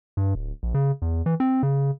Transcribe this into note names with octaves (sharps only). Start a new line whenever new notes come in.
G2
D1
A#1
C#3
E2
E3
C4
C#3